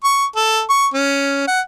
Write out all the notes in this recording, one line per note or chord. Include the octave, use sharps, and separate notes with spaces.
C#6
A4
C#6
C#4
F#5